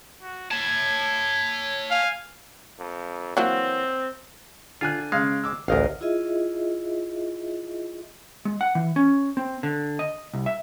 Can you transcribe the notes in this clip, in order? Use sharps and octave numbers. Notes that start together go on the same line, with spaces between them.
F#4
C#5 A5 G#6
F5 G#5
F2
E3 F#3 A#3 C4
D3 F4 G#5 F#6
C#3 G#3 F5
D6 E6
A1 D2 A#4 D#5 F5
E4 F4 G#4 D#5 E5
G#3
F#5
E3
C#4
C4
D3
D#5
C2
E5